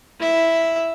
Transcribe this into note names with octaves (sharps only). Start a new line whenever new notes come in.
E4 E5